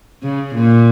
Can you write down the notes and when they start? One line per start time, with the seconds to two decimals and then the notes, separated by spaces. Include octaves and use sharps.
0.23 C#3
0.55 A#2